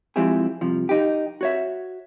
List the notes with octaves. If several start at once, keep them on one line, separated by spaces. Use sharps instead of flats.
F3 G#3 C4 E4 G4 G#4
C2 C3 F3
D#4 G4
F#4 C#5 E5